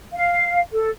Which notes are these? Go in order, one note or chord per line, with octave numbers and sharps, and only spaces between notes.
F5
A4